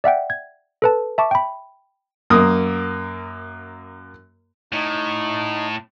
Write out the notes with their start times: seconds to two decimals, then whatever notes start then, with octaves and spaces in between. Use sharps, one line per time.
0.04 D5 E5 F#5 G5
0.30 G#6
0.82 A4 B4 A5
1.18 E5 A5 C#6 D6
1.31 G5 B5
2.30 F#2 A#3 D#6
4.73 A2 D#4